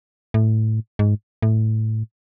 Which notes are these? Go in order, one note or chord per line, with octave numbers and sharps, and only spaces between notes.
A2
G#2
A2